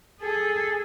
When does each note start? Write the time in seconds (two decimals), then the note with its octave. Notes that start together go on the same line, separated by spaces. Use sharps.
0.20 G#4 A4